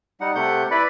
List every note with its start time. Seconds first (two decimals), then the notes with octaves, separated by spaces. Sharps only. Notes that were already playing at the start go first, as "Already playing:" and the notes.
0.21 G3 D#4 F#5
0.35 C3 A3 F#5 G6
0.71 E4 B4 D5 B5